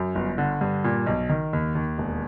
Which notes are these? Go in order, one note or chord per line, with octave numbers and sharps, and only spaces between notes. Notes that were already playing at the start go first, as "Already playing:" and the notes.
Already playing: F#2
G1
D3
G2
A#2
B1
D#3
D#2
D#2
E1